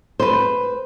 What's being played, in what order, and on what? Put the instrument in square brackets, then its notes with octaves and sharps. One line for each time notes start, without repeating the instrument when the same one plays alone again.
[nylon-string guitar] B4 C5